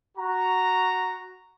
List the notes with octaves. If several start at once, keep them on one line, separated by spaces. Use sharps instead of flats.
F#4 A#5